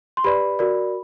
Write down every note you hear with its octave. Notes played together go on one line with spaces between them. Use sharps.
C6
G4 B4 D5 B5
F#4 A#4 D5